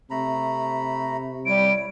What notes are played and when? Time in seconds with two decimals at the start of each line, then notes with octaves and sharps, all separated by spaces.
0.11 C3 A3 A#5 B5
1.46 G3 E4 C#5 D7